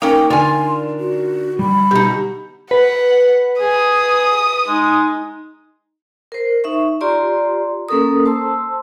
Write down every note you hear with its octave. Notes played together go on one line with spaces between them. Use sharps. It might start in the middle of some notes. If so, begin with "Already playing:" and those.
A#3 C#4 D#4 A#4 G5
D3 D4 F4 A#4 G#5 C6
F#4
G3 B5
B2 D#4 G4
B4 F#5
G#4 D#6
G#3 D#4
A#4 C5
D#4 E5 C#6
F4 G4 D5 A#5 C6
A#3 C#4 A4 A#4 D#6
C5 A5 C6 E6